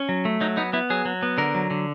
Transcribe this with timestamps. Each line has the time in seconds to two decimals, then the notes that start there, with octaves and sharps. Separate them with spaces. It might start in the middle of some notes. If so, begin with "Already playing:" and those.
Already playing: C#4
0.09 F#3
0.25 A3
0.41 F#3 D#4
0.57 B3 D#4
0.73 B3 E4
0.90 F#3 G#4
1.05 F#3
1.23 B3
1.38 D3 A#4
1.54 F#3
1.71 D3